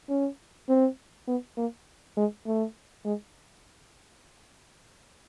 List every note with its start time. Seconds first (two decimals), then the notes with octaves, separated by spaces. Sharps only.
0.09 C#4
0.69 C4
1.28 B3
1.57 A#3
2.17 G#3
2.46 A3
3.05 G#3